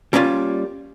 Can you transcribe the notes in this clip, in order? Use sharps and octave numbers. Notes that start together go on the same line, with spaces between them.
G3 A#3 C#4 D4 F4